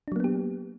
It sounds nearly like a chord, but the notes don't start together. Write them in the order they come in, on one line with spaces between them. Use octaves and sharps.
D4 F#3 A#3 B3 G4